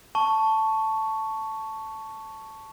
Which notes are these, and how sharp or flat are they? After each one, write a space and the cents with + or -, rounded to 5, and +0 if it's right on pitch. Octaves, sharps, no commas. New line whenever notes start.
A5 +0 C#6 +5